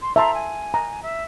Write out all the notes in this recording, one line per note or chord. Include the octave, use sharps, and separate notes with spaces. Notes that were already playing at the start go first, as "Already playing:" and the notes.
C6
E5 A5 A#5 C6
G#5
A#5
E5